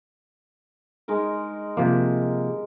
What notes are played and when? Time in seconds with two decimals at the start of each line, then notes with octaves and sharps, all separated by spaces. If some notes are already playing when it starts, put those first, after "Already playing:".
1.08 G#3 D#4 A#4
1.77 C3 F3 A#3